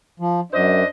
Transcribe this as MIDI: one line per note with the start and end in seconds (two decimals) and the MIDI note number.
0.20 0.40 53
0.52 0.83 42
0.52 0.86 62
0.52 0.86 72
0.52 0.86 75